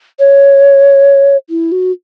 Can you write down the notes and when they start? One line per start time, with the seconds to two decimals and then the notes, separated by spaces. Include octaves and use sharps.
0.19 C#5
1.50 E4
1.72 F#4